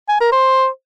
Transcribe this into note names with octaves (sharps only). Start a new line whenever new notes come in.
G#5
A#4
C5